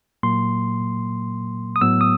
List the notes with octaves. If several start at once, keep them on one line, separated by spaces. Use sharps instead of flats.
A#2 F#3 A#3 C6
D#6
A2 F#3 B3 E6
D#6